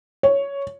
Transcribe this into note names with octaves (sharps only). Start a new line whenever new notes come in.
C#5